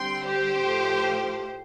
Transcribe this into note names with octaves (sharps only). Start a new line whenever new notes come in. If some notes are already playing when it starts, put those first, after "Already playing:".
Already playing: D3 G3 C4 G5 C6
G4 C5
A2 F3 A3